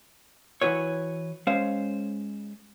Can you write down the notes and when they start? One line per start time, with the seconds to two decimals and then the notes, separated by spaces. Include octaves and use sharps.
0.61 E3 E4 F#4 B4 C#5
1.47 G#3 C#4 C5 F5